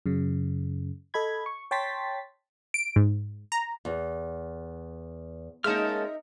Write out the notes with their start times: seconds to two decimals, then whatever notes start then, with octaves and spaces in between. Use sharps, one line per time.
0.06 F#2 C#3
1.14 A4 D#5 B5 G#6
1.46 C#6
1.71 C#5 G5 A5 C6 A6 B6
2.74 D7
2.96 G#2
3.52 A#5
3.85 E2
5.64 G#3 A#3 C#4 D#4 A#4 E5 A5 F6